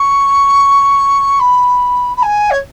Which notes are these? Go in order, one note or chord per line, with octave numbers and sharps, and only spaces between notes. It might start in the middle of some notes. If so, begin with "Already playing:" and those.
Already playing: C#6
B5
B5
G#5
C#5